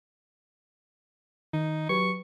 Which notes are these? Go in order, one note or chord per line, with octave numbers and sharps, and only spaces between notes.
D#3 D#4
F#3 G4 B4 C#6